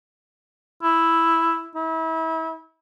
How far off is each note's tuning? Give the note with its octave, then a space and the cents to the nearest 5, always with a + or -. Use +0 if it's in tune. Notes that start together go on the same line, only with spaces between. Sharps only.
E4 +0
E4 -35